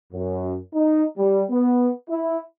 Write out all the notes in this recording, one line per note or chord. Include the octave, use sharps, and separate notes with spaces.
F#2
D#4
G3
B3
E4